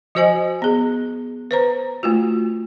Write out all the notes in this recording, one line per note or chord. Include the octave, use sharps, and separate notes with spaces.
F3 F#4 C5 D#5 G#5
B3 G#4
B4 C5 A#5
A3 F4 F#4